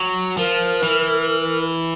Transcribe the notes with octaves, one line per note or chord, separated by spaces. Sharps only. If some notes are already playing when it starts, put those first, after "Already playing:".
Already playing: F#3
F3 A#4
E3